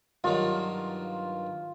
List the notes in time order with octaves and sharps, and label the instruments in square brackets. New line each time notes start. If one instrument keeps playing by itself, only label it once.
[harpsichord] G2 D#3 F#3 [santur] F4